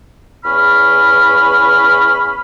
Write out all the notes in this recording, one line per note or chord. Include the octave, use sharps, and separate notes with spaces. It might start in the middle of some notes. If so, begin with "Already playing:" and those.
E2 C#4 B5 F6